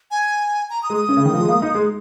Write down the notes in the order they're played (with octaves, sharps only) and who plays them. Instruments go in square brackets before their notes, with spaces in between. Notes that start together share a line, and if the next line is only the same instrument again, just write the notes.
[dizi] G#5
A#5
D#6
[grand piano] G#3
[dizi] D#6
[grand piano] C#4
C#3
D#3
F3
G#3
A#3
D#4
G#3